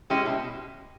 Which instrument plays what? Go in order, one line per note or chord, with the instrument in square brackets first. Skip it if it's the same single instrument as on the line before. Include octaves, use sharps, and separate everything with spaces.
[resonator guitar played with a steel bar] G#3 C#4 E4 G4
B2